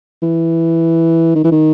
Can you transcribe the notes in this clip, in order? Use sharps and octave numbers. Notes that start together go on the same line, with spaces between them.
E3
D#3
E3
D#3